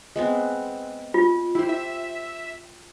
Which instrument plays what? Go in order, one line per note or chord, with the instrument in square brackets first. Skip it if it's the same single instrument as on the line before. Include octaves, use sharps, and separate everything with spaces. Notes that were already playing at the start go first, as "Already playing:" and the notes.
[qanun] G#3 B3 C4
[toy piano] F4
[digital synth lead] E4 [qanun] G4 C5
[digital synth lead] E5